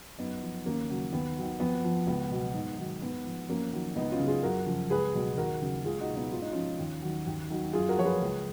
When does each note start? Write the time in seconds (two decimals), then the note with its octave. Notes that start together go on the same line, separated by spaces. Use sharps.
0.18 F#2 B3 D#4
0.42 F3
0.66 D#2 A#3 C#4
0.90 C#3 F#3
1.13 D#2 B3
1.37 D#3 F#3
1.60 F2 B3
1.84 F3
2.07 C#2 B3
2.31 B2 F#3
2.54 G#2
2.78 D#3 F#3
3.02 G#2 B3
3.26 F3
3.49 F2 A#3 C#4
3.73 D#3 F#3
3.96 C#2 B3 D#4
4.12 C#4 F4
4.19 C#3 F#3
4.27 F4 G#4
4.43 F#2 F#4 A#4
4.66 C#3 F3
4.90 C#2 G#4 B4
5.14 B2 F#3
5.37 D#2 F#4 A#4
5.61 C#3 F#3
5.85 C#2 F4 G#4
6.01 D#4 F#4
6.08 B2 F#3
6.16 B3 D#4
6.32 G#2 F4
6.42 D#4
6.52 F3 C#4 F4
6.79 D#2
7.02 D#3 F#3
7.27 D#2
7.50 D#3 F#3
7.73 F#2 F4 G#4
7.89 F#4 A#4
7.97 F3 C#5
8.05 G#4 B4
8.21 C#2